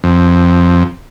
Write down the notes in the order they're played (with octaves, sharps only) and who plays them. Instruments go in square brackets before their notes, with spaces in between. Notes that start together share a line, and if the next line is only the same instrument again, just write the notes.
[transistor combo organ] F2